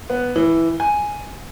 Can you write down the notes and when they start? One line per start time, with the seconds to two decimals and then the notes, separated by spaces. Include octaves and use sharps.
0.10 B3
0.36 E3
0.80 G#5